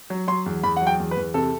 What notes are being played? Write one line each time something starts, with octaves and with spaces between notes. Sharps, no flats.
F#3
F#3 C6
E2
E2 B5
F#3 F#5
G5
E2
B4
E2
C3 A4